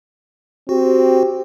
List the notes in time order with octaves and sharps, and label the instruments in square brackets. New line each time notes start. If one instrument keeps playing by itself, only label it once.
[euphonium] C4 [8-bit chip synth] F#4 [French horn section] G4